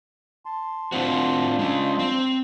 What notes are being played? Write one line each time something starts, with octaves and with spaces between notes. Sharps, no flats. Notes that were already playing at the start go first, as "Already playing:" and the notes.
A5 C6
A2 C4 D4 F4 F#4 C5
G#3 C#4
C4